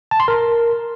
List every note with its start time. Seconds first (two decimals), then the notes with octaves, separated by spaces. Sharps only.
0.11 A5
0.20 C6
0.28 A#4